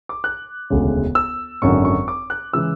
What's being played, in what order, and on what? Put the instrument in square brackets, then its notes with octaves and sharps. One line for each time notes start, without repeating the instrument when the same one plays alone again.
[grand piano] D6
F#6
E1 D2 C#3 G#3
E6
G#1 F#2 D3 C#6
C#6
D6
F#6
C#3 E3 G#3 E6